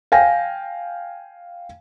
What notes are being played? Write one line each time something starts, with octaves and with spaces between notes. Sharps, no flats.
F5 G5 G#5 A#6